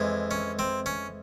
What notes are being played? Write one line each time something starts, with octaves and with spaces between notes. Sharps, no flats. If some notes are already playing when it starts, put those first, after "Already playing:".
Already playing: F2 E3 G#3
C#4
C4
C#4